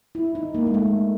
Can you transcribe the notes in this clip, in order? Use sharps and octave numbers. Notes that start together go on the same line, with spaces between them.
E4
D#4
A#3
G#3
A3